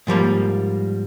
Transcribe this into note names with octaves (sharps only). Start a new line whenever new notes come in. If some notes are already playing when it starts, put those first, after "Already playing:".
G#2 F3 G3 A#3